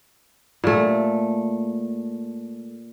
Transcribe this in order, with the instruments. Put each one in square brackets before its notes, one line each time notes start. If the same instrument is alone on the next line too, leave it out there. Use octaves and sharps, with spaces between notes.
[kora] A#2 A3